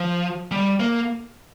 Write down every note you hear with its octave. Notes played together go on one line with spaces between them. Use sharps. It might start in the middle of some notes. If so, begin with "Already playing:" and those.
Already playing: F3
G3
A#3